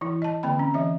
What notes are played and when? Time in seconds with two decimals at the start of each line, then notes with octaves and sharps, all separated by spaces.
0.01 E3 E4
0.22 D#5 A5
0.43 D3 A#3 C4 G5 B5
0.59 C#4
0.74 E3 D#5 E5